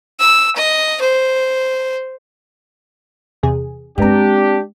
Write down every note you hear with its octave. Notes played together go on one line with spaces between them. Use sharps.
E6
D#5
C5
E2 C3 G#4
G2 G#3 B3 C4 D4 G4 A#5